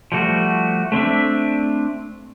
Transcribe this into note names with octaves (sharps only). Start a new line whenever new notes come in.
F3 G3 A3 F#4
A3 C4 D4 E5